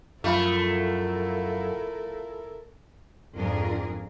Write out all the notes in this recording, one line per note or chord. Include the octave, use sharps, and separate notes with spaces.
F#2 F3 A3 E4 A4 A#4 F5 B5
F2 G#2 F3 D4 G#4 A#4